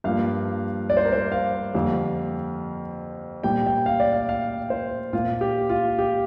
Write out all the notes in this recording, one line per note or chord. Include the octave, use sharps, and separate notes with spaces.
G2 F3 A#3 F5
D5
C5
A#4
C5
F5
F2 D3 G3 A#3
A#2 G3 A#3 G5
G5
F5
D5
F5
F5
C5
A#2 A#3 F4
G4
F4
G4